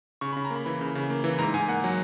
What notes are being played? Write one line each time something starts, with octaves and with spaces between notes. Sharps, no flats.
C#3 C#6
C#3 B5
A#5
A#3
B5
E3
C#3
C#3
A#3
E3
G#2 A#5
G#2 G#5
A#3 F#5
F#3